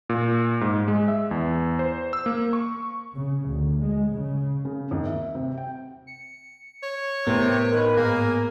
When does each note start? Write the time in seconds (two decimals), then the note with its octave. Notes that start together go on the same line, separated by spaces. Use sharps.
0.09 A#2
0.61 G#2
0.88 G#3
1.08 E5
1.31 E2
1.79 C5
2.13 E6
2.26 A#3
2.53 C#6
3.16 C#3
3.46 D2
3.82 G#3
4.13 C#3
4.65 C#3
4.91 D#2
5.05 E5
5.35 C3
5.57 G5
6.07 C#7
6.83 C#5
7.27 A2 C3 B3 A#4
7.73 D#3 B4
7.97 G#2 A#3 G#4